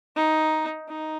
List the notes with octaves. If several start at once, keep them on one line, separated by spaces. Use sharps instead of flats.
D#4
D#4